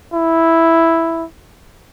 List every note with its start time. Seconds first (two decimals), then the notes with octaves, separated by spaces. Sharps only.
0.13 E4